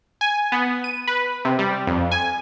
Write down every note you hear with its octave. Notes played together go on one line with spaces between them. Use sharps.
G#5
B3
D#7
B4
C3
G3
F2
G#5